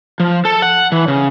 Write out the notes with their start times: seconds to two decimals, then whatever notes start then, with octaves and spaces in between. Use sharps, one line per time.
0.20 F3
0.45 A4
0.62 F#5
0.92 E3
1.08 C#3